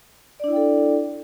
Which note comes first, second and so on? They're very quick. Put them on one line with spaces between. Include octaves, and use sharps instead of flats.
D5 D4 E4 G5 A4